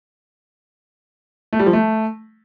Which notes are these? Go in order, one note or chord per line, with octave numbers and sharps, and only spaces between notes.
A3
G3
F3
A3